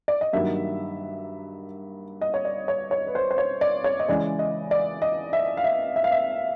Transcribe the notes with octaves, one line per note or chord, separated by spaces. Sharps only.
D5
D#5
G2 D#3 F#3 A#3 E5
D#5
C#5
D5
C#5
C#5
B4
C5
C5
C#5
D5
C#5
D#5
C#3 E3 G#3 D5
D#5
D5
D#5
E5
F5
E5
E5
F5
E5